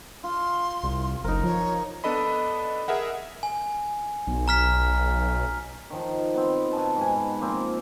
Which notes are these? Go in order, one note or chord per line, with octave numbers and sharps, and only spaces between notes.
F4 C6
C2
F#1 D#4 A#4 C5
F3 C#5
B3 D4 A4 D#5 B5
G#4 A#4 E5 F#5
G#5
B1
A#5 F6 B6
D#3 F3 D#4
B3 C4
B2 A5
G#2 B4 G#5
F3 A#3 C4